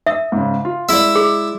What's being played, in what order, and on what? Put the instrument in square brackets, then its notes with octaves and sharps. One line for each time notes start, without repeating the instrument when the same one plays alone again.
[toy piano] E5 [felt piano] D#6 E6
[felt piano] G#2 C#3
F4
[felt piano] G#3 D5 [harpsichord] E4 E5
[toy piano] G#4